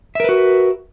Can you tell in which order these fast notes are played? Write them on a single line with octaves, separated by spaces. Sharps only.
E5 A#4 B4 F#4